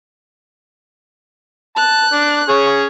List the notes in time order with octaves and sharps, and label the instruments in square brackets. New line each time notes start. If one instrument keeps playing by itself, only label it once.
[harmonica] A5 [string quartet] F#6
[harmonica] D4
C#4 G#4 C#5